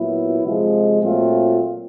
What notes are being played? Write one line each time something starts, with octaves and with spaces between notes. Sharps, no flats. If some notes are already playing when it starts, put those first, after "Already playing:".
Already playing: A#2 F#3 B3 E4
C3 F3 G#3
A#2 F#3 A3 C4 F4